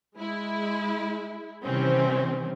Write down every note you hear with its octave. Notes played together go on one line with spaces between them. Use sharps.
G#3 E4
C3 D#3 E3 G3 C4 C#4